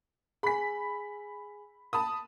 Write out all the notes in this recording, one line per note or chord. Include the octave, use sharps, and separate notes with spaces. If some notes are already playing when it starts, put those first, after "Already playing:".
G#4 G#5 B5 B6
A5 B5 D#6